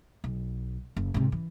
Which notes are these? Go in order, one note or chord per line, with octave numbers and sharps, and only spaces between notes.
B1
F#1
G#2 C3
E3